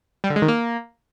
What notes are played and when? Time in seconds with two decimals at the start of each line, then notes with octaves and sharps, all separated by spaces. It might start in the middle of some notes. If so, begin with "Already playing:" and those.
0.24 G3
0.30 D3
0.36 G#3
0.42 D#3
0.48 A#3